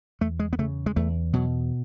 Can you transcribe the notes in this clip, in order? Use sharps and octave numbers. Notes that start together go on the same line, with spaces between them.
E2 A3
G#3
B3
C#3 A3
G#3
E2 A3
B2 F#3